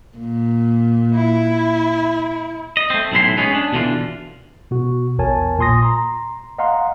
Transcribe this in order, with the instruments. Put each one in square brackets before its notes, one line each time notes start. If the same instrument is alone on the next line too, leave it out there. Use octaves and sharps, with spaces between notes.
[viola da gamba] A#2
[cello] E4
[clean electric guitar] D#5
A3 C4
B1 A2 E3 E4 C6
G#3 B3 C#4 G#4
D4
B2 D3 E3 F4
[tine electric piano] B2 F#4
A#1 E2 A#4 C#5 G#5 A5
A#2 G#5 C6 D#6 A#6
A#5 C6
D#5 F5 F#5 A#5 C6